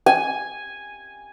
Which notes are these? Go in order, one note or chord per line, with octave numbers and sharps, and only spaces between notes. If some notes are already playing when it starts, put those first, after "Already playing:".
G#5